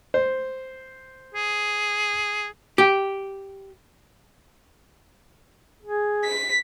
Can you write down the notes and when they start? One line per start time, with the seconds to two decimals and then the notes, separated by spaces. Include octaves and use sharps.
0.14 C5
1.34 G#4
2.78 G4
5.83 G#4
6.24 B6